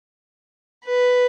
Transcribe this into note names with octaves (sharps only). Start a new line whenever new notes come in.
B4